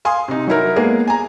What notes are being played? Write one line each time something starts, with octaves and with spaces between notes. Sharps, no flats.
F5 G#5 C6 D#6
C3 D#4
F#3 D#4 E4 A#4
G#3 A#3 B3 G#4
G#5 A#5